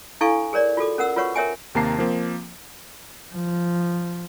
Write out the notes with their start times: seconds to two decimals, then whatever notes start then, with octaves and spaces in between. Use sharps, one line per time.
0.21 D4 E4 A4 F5 G#5 C#6
0.53 G#4 A#4 C#5 D5
0.77 F4 F#4 A4 D6
0.98 C#4 A#4 F#5 E6
1.16 F4 F#4 B4 C#5 F#5 C#6
1.35 A#4 C#5 E5 G5 G#5 D6
1.75 D#2 C3 A#3 A5 A#5 C7
1.98 F3 A#3 C4
3.33 F3